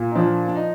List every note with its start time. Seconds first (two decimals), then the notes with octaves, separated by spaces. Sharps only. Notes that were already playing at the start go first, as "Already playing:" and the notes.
Already playing: A#2
0.12 D#4
0.15 F3 D4
0.48 D4
0.55 D#4